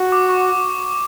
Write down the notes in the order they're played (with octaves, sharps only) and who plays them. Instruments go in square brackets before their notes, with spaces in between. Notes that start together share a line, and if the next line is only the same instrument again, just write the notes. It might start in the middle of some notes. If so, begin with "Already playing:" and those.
Already playing: [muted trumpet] F#4
[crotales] D6
C#6